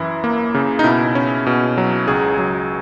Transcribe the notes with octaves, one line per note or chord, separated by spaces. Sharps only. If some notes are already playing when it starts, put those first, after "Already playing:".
Already playing: F#2 E3 E4
A#3
C#3
D#4
B2 E4
C#4
B2
F#3
C#2 G#4
F#3